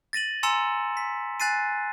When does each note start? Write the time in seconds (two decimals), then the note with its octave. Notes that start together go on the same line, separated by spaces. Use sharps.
0.13 A6 A#6 D#7 F#7
0.43 G#5 A#5 C6 E6 C#7 E7
0.97 B6
1.40 G#5 F#6 A6 C7 D#7